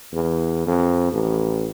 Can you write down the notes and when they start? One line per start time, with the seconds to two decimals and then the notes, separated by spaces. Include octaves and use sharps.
0.13 E2
0.67 F2
1.12 A1